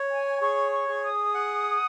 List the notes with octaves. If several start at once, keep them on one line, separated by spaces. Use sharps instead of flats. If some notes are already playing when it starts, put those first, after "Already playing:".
Already playing: C#5
G#5
G#4 C#6
C#6
G#4
D#6
F#5